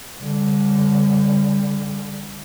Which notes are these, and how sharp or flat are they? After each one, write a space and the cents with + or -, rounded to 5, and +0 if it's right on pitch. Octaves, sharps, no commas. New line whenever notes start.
D3 -20 G3 +30